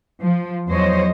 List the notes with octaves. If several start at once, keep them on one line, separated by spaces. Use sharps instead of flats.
F3
E2 F3 F#3 C5 C#5 D#5